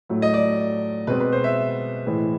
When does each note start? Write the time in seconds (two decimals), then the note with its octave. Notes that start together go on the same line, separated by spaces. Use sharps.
0.09 A2 F#3 A3
0.22 D#5
0.34 D5
1.07 B2 G#3 C4 B4
1.20 B4
1.32 C5
1.44 E5
2.05 A2 E3 G#3